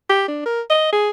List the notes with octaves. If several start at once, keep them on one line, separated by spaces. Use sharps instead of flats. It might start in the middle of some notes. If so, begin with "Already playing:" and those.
G4
D4
A#4
D#5
G#4